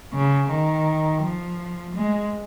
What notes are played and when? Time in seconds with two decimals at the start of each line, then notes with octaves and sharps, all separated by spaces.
0.14 C#3
0.50 D#3
1.22 F3
1.95 G#3